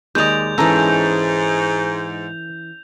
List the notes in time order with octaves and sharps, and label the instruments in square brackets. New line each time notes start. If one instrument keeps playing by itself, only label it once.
[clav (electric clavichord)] D#2 D#5 [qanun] G#3 D5 [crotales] G6 F7
[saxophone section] G#2 [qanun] E3 C#4 [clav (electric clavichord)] A4 A#5